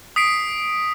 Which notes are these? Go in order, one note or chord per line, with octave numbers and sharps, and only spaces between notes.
D#6 B6 C7 D7